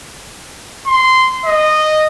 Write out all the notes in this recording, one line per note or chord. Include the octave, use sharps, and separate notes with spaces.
C6
D#5